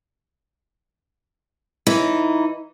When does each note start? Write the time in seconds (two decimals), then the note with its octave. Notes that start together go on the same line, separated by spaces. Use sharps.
1.87 E3 D#4